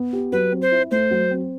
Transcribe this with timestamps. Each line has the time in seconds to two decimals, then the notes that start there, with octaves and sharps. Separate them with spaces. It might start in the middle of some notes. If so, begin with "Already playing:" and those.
Already playing: B3
0.13 G4
0.32 F#3 B4
0.52 C4
0.62 C5
0.72 E4
0.91 A3 C5
1.11 F#3
1.31 C4